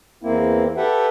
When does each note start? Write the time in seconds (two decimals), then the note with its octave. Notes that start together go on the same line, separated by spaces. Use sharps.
0.23 E2 A#3 C4 E4
0.77 G4 A4 B4 E5 F#5 G5